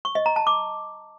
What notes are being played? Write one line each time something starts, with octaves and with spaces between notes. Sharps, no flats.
C#6
D#5
A#5
A5
D6